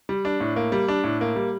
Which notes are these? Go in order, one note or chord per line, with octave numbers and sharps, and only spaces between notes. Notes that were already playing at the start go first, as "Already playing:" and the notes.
G3
D4
A2
A#3
G3
D4
A2
A#3
G3